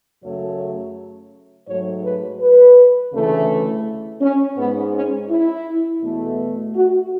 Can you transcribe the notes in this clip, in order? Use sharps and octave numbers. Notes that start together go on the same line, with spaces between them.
F#2 C#3 F#3 A3 C#5
G#2 F#3 A3 C#5
B4
B4
D2 C#3 E3 A3
C#4
G#2 G#3 B3
C#4
E4
E2 B2 A3
F#4